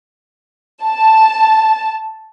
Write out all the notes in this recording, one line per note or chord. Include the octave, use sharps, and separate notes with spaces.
A5